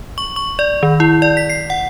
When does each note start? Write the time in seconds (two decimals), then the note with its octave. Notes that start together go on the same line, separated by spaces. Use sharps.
0.18 C#6
0.36 C#6
0.59 D5
0.83 D#3
1.00 E4
1.22 D5
1.37 B6
1.50 C7
1.70 F#5